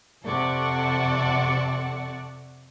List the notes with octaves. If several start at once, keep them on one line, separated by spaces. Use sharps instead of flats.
F2 C3 A4 D5 F#5 C#6